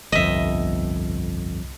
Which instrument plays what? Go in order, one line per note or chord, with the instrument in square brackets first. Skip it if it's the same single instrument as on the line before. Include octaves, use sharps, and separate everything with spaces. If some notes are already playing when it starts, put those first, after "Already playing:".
[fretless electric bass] G1 F2 [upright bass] C2 [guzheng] D#5 E5